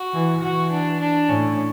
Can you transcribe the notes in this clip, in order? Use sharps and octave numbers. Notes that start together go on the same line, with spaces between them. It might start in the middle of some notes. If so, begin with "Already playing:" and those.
Already playing: F#4
E3
E3 F#4
D4
D4
A2 C#4